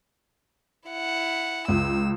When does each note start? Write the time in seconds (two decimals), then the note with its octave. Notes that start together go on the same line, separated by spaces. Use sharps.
0.89 E4 F#5
1.68 C#2 E6